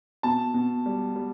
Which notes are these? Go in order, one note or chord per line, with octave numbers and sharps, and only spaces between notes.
B2 A5
B2
G3
G3